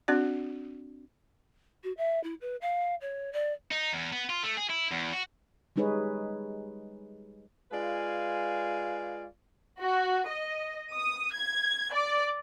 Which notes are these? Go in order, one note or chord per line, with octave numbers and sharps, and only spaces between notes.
C4 D4 F#4 D5
F#4
E5
E4
B4
F5
C#5
D5
D#4
E2
B3
F4
A3
G#4
E4
E2
F#4
G3 G#3 D#4 G#4 B4 C#5
G#3 F4 B4 D5 F5 G#5
F#4
D#5
D#6
G#6
D5